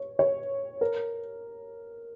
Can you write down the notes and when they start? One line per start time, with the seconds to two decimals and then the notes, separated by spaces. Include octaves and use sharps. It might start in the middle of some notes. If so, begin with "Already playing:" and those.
Already playing: C#5
0.19 C#5
0.81 A#4